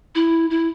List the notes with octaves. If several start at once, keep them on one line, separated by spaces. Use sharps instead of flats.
E4
E4